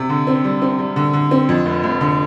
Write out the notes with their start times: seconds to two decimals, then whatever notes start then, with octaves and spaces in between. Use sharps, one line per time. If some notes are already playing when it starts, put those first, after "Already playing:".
Already playing: C3
0.09 D3
0.27 C4
0.44 G3
0.62 C4
0.79 G3
0.96 D3
1.13 D3
1.31 C4
1.49 F2
1.66 F1
1.84 F1
2.01 D3